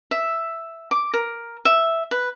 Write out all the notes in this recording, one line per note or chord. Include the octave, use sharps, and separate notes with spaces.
E5
D6
A#4
E5
B4